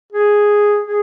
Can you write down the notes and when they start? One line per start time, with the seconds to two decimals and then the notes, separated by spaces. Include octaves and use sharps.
0.12 G#4
0.84 G#4